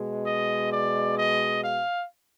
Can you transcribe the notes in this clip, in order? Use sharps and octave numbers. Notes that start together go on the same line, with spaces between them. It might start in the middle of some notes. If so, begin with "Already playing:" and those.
Already playing: B2 G#3
D#5
D5
D#5
F5